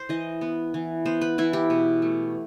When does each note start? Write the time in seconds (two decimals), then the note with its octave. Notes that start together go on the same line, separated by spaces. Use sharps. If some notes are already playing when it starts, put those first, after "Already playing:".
Already playing: C5
0.09 E3 D#5
0.41 B3
0.74 E3
1.05 B3 C5
1.21 B4
1.38 E3 E4
1.53 G4
1.70 B2
2.02 A3